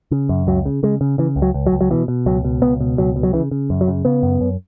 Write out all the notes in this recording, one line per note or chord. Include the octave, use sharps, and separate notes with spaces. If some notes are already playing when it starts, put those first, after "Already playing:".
C#3
F#2
C#2 F#3
C#3
C#3 G#3
C#3
C#3 E3
C#2
F#3
C#2
F#3
C#2
F#3
B2 E3
B2
C#2 F#3
B2
C#2 B3
B2
C#2 F#3
B2
F#3
C#3 E3
C#3
F#2
F#3
C#3
C#3 B3
F#2
F#2